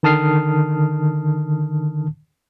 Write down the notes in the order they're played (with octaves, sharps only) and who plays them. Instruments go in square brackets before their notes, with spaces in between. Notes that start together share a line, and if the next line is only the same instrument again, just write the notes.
[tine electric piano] D3 D#3 A5 D#6 F6 C7